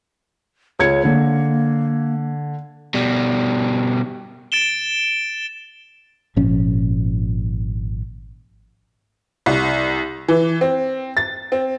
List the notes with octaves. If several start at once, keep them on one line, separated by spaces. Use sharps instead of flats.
C#2 C#5 G#6 C#7
D3 A#3
B2 G3
A6 D7 E7 G7
G#1 A#2 F3 C#4
C2
E3
C4
A6
C4